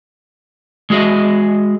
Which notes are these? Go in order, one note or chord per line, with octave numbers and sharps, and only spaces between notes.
G#3 F#4 G#4 D#5 E5